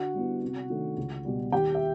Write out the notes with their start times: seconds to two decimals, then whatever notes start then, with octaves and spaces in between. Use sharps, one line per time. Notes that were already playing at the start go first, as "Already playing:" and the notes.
Already playing: D3 F#4 F#5
0.14 G3 B3 E4
0.42 C3
0.70 D#3 F#3 A3 D4
0.97 C#2
1.25 B2 G3
1.52 D#2 G4 G5
1.75 E5